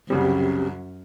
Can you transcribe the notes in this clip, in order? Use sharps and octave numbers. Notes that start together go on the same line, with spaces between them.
C2 F#2 C#3 G3 C4 G4